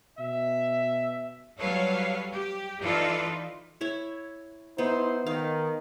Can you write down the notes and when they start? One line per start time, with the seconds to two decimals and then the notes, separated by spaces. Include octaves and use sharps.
0.19 B2 E5
1.60 F#3 G3 A4 B4 C#5 F5
2.32 G4
2.83 E3 D#4 F4 A4 B4 D5
3.81 E4 C#5 E5
4.78 B3 D#4 E4 C5
5.27 D#3 F5